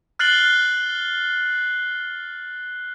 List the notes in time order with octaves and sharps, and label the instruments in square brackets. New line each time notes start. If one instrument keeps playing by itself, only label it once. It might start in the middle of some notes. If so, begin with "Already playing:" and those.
[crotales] F6 F#6 A6 C7 F#7 G7